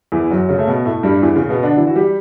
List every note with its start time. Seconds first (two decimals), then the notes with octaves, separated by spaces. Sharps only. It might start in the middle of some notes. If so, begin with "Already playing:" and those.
0.12 E2 E3
0.30 F#2 F#3
0.49 C#3 C#4
0.59 A3
0.67 B2 B3
0.85 A2 A3
1.03 G2 G3
1.22 E2 E3
1.36 C#3
1.49 B2 B3
1.63 D3 D4
1.77 E3 E4
1.87 F#4
1.96 G3 G4